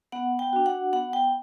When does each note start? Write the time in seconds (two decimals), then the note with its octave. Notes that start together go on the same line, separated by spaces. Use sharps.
0.12 B3 F#5
0.39 G5
0.53 D4 F#4
0.66 F#5
0.93 B3 F#5
1.13 G5